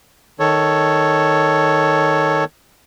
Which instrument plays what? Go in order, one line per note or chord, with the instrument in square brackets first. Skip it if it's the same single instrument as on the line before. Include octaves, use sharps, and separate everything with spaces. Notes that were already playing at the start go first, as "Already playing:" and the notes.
[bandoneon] D#3 A4 C#5